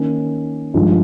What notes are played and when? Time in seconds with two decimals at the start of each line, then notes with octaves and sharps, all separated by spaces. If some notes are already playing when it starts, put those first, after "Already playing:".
Already playing: D#3 A#3 C#4
0.74 G2 F3 G#3 D#4